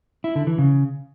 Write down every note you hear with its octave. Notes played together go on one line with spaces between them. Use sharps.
E4
D3
E3
C#3